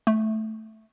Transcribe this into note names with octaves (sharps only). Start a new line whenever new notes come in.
A3